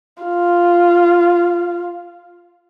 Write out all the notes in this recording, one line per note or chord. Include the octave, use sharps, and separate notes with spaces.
F4